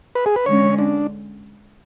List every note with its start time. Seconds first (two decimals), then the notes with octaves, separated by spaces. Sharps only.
0.15 B4
0.26 G#4
0.36 B4
0.46 D3 G#3 C#4 C#5
0.78 D4